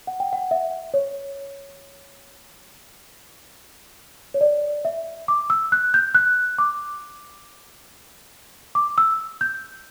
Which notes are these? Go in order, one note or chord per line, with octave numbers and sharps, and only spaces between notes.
F#5
G5
F#5
E5
C#5
C#5
D5
E5
D6
E6
F#6
G6
F#6
D6
D6
E6
G6